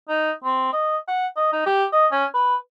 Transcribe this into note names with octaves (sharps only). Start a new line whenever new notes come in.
D#4
C4
D#5
F#5
D#5
D#4
G4
D#5
C#4
B4